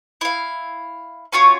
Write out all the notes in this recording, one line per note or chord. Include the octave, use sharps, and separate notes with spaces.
E4 F5
C#4 F4 F#4 C#5